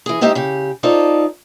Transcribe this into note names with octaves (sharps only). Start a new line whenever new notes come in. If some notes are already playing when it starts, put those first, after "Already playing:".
E3 G#4
G#3 C4 D#4 G4 D#5 E5
C#3 G4
D#4 F4 A4 C5 D5